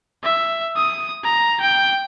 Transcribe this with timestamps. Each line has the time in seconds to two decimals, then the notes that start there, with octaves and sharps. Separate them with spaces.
0.24 E5
0.76 D#6
1.24 A#5
1.61 G5